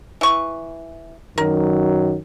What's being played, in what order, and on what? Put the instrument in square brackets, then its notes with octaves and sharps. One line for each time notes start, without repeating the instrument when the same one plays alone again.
[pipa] E3 C#6
[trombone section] F#2 D#3 F#3 [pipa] A#4